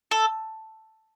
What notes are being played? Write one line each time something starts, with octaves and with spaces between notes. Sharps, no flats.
A4